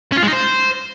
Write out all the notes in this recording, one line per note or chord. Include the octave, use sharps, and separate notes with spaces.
C#4
F4
G#3
D#4
C5